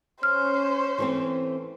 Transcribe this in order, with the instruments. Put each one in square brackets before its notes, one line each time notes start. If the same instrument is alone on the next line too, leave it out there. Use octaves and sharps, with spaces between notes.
[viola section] C#4 [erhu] C5 [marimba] F6
[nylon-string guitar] E3 A3 C4